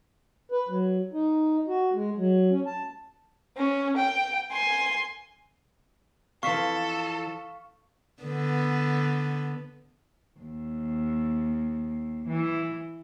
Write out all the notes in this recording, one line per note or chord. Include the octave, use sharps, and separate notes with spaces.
B4
F#3
D#4
F#4
G#3
F#3
C#4
A5
C#4
G5
G#5 C6
F2 E3 A4 F5 C#6 B6
D3 B3
D#2
E3